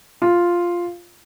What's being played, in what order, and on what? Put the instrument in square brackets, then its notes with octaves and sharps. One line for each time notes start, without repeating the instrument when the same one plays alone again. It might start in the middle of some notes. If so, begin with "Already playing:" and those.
[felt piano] F4